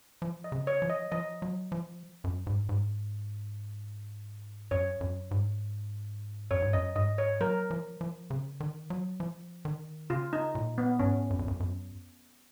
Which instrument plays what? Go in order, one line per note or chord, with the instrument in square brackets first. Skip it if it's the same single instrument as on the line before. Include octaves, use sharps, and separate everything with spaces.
[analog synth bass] F3
[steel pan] D#5
[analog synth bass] C#3
[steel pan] C#5
[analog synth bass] F3
[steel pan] D#5
[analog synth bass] F3 [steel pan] D#5
[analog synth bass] F#3
F3
F#2
G#2
G#2
[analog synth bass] F#2 [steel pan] C#5
[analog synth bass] F#2
G#2
[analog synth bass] F#2 [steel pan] C#5
[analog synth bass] G#2
[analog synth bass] F#2 [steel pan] D#5
[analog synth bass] G#2 [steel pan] D#5
[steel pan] C#5
[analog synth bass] F#3 [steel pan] A#4
[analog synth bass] F3
F3
C#3
D#3
F#3
F3
D#3
[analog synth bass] C#3 [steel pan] F4
[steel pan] D#4
[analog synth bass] A#2
[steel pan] B3
[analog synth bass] G#2 [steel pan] C#4
[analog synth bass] F#2
F2
F#2
F#2